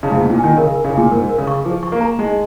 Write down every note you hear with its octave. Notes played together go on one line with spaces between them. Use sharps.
C#3 D#4
G#2
A#2
D#4
A#2
D#3 G#5
C#3 A#4
A#4
C#3
A#2 G#5
G#2 A#4
A#4
C#3
C#6
F3 G#4
C#6
A#3
A#5
G#3 D#4